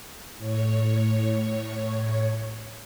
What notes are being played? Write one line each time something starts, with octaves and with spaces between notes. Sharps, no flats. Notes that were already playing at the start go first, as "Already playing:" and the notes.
A2 C#5